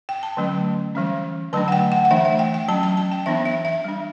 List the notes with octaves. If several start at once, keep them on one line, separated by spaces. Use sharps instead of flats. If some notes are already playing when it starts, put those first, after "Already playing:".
G5
A5
D3 F#3 A3 C#4
E3 G3 C#4
D3 F#3 A3 D4 A5
F#5
G5
F#5
F#5
E3 A3 D4 E5
E5
G5
G5
F#3 C#4 A5
A5
A5
G5
E3 B3 D4 E5
E5
E5
G3 D4